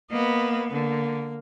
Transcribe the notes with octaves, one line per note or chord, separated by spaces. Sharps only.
A#3 B3 D#5 B5
D3 A#3